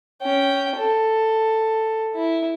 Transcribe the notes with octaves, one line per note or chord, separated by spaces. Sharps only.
C#4 G5
A4
E4